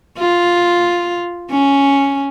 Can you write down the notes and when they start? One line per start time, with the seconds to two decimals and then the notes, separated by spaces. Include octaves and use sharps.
0.19 F4
1.51 C#4